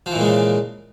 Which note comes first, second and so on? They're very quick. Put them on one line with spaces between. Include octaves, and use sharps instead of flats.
F3 E3 A#2 G#3 C#3